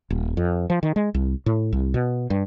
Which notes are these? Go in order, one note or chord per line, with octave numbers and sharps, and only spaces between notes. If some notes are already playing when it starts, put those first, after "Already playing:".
D#1
F2
F3
D#3
G#3
C2
A2
C2
B2
G2